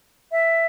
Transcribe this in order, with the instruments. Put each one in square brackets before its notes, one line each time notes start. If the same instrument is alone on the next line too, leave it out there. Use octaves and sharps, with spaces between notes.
[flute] E5